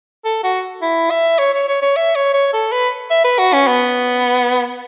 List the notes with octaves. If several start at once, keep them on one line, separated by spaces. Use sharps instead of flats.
A4
F#4
E4
E5
C#5
C#5
C#5
C#5
E5
C#5
C#5
A4
B4
E5
B4
F#4
C#4
B3